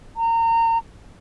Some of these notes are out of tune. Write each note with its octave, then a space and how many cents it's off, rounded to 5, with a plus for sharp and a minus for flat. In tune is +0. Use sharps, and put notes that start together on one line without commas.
A#5 -30